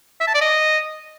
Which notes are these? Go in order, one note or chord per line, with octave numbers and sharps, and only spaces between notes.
E5
A5
D5
D#5